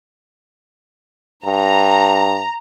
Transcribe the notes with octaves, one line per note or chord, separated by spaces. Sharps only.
G2 A#5